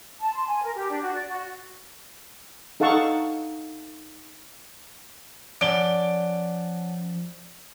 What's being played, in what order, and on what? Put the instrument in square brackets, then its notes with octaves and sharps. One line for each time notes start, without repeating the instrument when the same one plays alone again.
[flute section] A5
C6
G#5
A#4
G4
D4
F#4
D5
F#4
[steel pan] D#4 A4 F5 F#5 A5 C#6
[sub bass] F3 [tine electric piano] C#4 F#5 A5 [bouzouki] D5 [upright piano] D7 G7